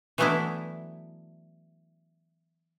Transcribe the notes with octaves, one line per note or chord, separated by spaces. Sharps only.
E3 F#3 A3 B3 D4 E4